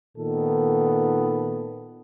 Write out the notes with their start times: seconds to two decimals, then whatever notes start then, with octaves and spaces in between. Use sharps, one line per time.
0.18 A#2 D#3 B3 A4